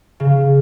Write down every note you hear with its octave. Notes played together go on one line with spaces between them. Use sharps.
C#3